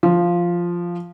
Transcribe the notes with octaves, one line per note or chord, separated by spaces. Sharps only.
F3